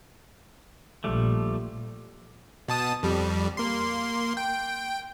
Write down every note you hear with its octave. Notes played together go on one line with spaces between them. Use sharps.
A#1 F3 G3 A3
B2 A5 D#6
F2 G3
A#3 C6
G5